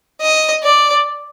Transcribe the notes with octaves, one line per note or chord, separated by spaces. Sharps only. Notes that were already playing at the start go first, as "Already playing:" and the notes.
D#5
D5